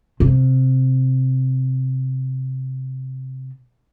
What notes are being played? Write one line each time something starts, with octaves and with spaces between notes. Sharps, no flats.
C3